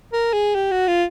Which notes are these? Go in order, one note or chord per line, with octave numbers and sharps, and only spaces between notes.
A#4
G#4
G4
F#4
F4